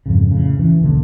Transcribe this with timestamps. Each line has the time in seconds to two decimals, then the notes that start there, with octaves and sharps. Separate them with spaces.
0.06 F2 G#2 C#3
0.31 A2 C#3
0.59 E3 C#4
0.81 D#1 B1 D3 A#3